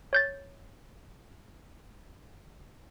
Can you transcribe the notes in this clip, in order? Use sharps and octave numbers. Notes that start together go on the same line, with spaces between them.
C#5 G6 A6